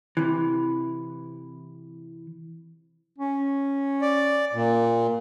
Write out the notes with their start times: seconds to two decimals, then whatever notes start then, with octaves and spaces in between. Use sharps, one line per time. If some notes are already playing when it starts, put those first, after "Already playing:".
0.17 C3 E3
3.18 C#4
4.02 D5
4.53 A#2